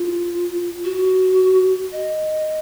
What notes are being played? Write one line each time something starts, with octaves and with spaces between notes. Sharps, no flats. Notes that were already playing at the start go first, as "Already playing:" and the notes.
Already playing: F4
F#4
D#5